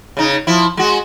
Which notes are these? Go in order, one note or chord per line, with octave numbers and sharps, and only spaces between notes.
C#3 D#4
F3 E4
G#3 F#4